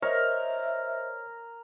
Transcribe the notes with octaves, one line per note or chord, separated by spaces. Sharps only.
A#4 C5 C#5 D#5 E5